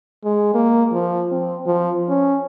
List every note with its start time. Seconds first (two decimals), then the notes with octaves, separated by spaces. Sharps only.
0.24 G#3
0.55 A#3
0.93 F3
1.31 C4
1.66 F3
2.08 C#4